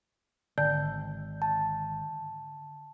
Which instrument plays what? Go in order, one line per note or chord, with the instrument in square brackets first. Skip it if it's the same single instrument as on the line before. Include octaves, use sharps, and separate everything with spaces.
[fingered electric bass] G#1 [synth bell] D3 [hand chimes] G6
[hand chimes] A5